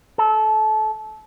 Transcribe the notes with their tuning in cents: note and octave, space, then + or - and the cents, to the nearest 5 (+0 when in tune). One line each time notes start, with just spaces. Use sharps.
A4 -25